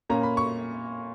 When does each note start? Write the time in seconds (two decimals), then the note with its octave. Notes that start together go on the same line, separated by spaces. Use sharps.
0.09 A#2 A#3 C#4 A#5
0.23 B5
0.37 C#6